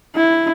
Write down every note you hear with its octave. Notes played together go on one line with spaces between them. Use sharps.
E4